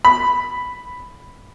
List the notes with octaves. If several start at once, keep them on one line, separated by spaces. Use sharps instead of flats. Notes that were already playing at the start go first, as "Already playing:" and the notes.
B5